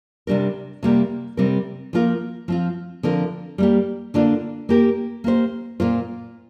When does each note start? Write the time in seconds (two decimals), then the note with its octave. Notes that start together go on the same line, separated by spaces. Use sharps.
0.27 C3 G3 D4 G4 A#4
0.83 C3 G3 A#3 G4
1.37 C3 G3 C4 A#4
1.93 F3 A#3 F4 A#4
2.48 F3 C4 F4
3.03 D3 F3 C4 F4 A#4
3.58 G3 A#3 G4
4.14 D3 A#3 D4 F4
4.69 A#3 G4 A#4
5.24 A#3 G4 C5
5.80 A#2 A#3 F4 C5